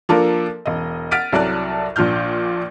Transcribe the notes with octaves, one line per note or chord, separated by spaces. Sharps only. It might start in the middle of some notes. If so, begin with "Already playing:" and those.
F3 A#3 D4 F4 A4 A#4
E1 D#5
F#5 F6 A6 B6 D7 D#7
C2 F#3 A4 D5 A5 F#6
A#1 A#2 D4 F6 G6